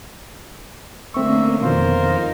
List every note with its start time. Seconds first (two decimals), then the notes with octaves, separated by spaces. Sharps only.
1.14 D3 A3 A#3 C4 C#4 E5 C#6
1.62 F2 B2 D#3 F4 A#4 C5
2.02 D#4